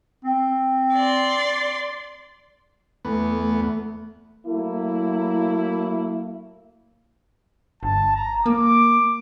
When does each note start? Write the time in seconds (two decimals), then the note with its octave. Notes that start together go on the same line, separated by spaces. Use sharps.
0.25 C4
0.94 D5 C6
3.05 E2 A3 B3
4.46 F#3 A3 A#3 E4
7.83 G1 A5
8.15 A#5
8.46 A#3 D6